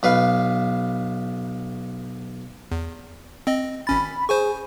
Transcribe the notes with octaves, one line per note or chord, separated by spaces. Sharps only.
B1 B4 F5
E2
C4 D#5
G#1 C#4 B5 A6
G#4 C5 G#5 C#6